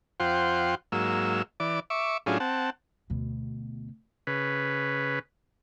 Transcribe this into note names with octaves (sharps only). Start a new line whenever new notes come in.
F2 F4 C5 F#5 G5 C6
G#2 F#3 A#3 E6
E3 D5 D6
E5 C#6 D6
A2 F#3 C#4 D4 F4 G#4
C4 F#5 A5
D2 B2
C#3 B4